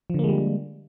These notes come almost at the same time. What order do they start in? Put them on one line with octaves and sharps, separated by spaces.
F3 D3 A#3 G#3 G3